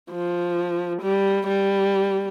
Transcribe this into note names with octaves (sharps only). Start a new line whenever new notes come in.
F3
G3
G3